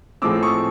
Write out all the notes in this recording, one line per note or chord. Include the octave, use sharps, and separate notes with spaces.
A2 F3 G#3 C4 D6 E6
C#6 D#6